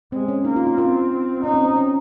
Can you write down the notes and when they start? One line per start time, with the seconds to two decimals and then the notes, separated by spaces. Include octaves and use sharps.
0.12 G#3 C4
0.28 C#4
0.45 A#3 D#4
0.56 F4
0.67 F4
0.77 C4 F4
1.43 C#4 D#4
1.54 C4
1.65 C4
1.76 C#4